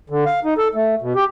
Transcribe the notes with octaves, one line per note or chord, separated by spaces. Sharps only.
D3
F5
D#4
A4
A3
B2
G4